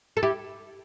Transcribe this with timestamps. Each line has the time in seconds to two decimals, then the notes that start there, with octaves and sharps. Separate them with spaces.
0.17 A4
0.23 E4 G4